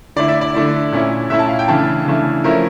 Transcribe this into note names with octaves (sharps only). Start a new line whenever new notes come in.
D3 A3 E4 D5
E5
D5
D3 A3 E4
A#2 A3 C#4 E4
A#2 A3 C#4 E4 E5
A5
F5
G5
C#3 E3 A3 D4 A5
C#3 E3 A3 D4
F3 A3 C#4 E4 A#4